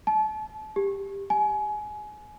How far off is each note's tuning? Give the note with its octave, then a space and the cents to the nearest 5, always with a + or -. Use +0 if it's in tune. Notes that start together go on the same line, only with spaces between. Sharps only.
A5 -35
G4 +10
G#5 +25